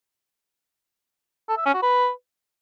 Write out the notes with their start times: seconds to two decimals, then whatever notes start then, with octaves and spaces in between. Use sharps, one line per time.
1.49 A4
1.57 E5
1.66 C#4
1.74 F#4
1.83 B4